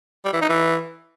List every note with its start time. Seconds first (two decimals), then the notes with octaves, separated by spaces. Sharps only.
0.25 G3
0.33 E3
0.41 D#4
0.49 E3